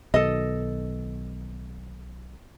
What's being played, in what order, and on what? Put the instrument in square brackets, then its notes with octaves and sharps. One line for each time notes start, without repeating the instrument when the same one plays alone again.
[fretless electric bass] B1 B2 D#3 [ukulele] A4 D#5